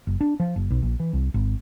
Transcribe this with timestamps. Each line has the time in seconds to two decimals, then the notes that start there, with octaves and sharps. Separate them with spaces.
0.07 F#1
0.21 D4
0.40 F3
0.56 F#1
0.70 B1
0.82 A#1
1.00 E3
1.13 C2
1.34 G#1